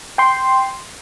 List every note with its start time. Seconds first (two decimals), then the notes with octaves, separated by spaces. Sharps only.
0.18 G5 C6